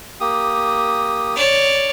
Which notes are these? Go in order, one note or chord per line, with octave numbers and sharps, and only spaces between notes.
A#3 G4 D#6
C#5 D5